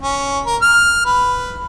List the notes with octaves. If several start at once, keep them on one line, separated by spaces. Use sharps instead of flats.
C#4
A#4
F6
B4